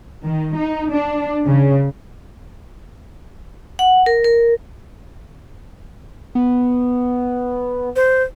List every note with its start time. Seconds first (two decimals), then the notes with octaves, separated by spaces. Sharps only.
0.24 D#3
0.56 D#4
0.91 D4
1.46 C#3
3.79 F#5
4.06 A#4
4.24 A#4
6.35 B3
7.96 C5